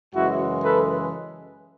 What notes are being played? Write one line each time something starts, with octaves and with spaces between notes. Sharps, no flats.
F#2 C#3 E3 G#3 E4 F#4
A4 B4